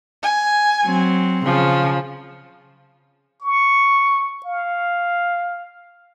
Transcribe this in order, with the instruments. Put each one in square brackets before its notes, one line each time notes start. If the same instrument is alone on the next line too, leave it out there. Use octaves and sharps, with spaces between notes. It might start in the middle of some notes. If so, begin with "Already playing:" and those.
[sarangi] G#5
[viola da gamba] F#3 C4
[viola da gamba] C#3 [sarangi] F3
[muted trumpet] C#6
F5